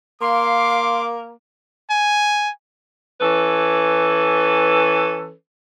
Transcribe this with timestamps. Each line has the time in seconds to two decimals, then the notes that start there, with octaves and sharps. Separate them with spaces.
0.21 A#3 F5 C6 D6
1.90 G#5
3.21 E3 C#4 A4 B4